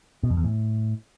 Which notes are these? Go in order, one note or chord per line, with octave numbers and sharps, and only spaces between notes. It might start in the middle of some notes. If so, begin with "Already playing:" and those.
B2
F2
E2
A2